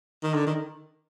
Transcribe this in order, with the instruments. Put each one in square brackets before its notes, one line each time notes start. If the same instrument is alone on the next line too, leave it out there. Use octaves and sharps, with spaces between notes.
[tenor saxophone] D#3
D3
D#3